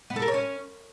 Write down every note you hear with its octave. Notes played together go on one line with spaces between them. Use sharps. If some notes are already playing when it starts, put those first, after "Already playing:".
B3
A4
A#4
C#5
C#4